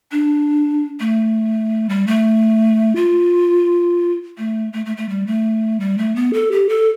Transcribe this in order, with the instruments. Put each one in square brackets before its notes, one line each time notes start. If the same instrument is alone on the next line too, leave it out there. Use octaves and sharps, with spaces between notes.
[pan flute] D4
A3
G3
A3
F4
A3
A3
A3
A3
G3
A3
G3
A3
B3
A4
G4
A4